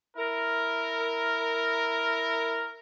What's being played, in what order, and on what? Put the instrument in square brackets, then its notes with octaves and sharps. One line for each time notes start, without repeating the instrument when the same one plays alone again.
[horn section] E4 A#4